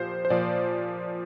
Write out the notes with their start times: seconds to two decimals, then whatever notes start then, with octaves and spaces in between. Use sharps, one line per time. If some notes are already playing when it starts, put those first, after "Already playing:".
Already playing: A#2 F3 G4 C5
0.25 C5
0.30 A#2 F3 D5